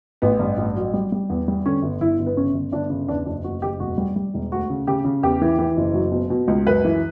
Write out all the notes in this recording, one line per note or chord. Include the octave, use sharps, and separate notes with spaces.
A1 B3
G2
A1
F#3
G3
G3
E2
G3
D3 C#4
G1
G1 E4
G1
B3
C#3 C#4
G1
G1 D4
C#3
E2 D4
F#1 D4
F#1 F#4
F#1 G4
E1 F#4
G3
G3
E1
D2 F#4
C#3
C#3 G4
C#3
E2 G4
E3
E3
F#1
F#3
B2
B2
C#2
F#2 B4
E3